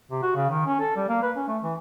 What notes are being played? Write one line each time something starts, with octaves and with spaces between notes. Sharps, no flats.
C3
F#4
C#3
D#3
C#4
A4
G3
A#3
B4
C#4
A3
E3